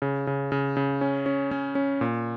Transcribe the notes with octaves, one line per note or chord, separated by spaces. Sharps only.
C#3
C#3
C#3
C#3
C#4
C#4
C#4
C#4
A#2